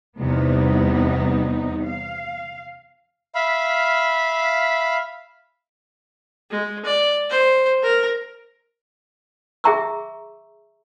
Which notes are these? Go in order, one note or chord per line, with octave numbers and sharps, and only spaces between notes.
E2 C3 G3 B3 D#4
F5
E5 F5 B5
G#3
D5
C5
A#4
G#4 E5 G5 A#5 C#6 E6